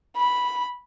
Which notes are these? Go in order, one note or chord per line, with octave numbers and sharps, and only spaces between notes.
B5